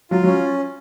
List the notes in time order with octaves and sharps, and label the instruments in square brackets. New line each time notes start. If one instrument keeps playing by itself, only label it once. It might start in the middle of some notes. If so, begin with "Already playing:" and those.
[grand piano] F#3 [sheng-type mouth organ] F4
[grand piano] F#3 [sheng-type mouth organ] C#4